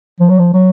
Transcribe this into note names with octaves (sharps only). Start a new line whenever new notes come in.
F3
F#3
F3
F#3